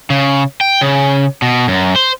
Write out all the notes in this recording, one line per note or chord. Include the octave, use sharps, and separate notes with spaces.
C#3
G5
C#3
B2
F#2
C5